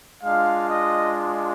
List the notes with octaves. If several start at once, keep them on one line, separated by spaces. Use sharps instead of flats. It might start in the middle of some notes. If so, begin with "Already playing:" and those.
G#3 D4 F4 F5
D#5